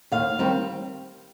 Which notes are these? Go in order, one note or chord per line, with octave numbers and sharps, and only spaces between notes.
D#2 F5
D#3 G3 C4